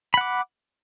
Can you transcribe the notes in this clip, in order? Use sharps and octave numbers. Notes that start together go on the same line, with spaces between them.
F#5 B5 D6